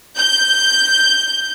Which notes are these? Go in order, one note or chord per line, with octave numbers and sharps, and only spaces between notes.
G6